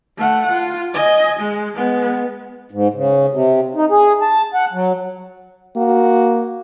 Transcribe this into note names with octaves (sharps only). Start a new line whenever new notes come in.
A3 F#5
F4
D#5 G#5
G#3
G#3 B3
G#2
C#3
C3
D#4
G#4
A5
F#5
F#3
A#3 F#4